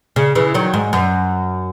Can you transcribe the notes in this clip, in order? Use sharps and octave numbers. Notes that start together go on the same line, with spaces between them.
C#3
C#3 E3
D#3 F#3
G#2
F#2